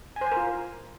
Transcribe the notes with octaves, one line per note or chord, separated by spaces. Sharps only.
G#5
C5
G#5
A#4
F4